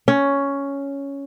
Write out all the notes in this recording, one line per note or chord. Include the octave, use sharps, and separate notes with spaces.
C#4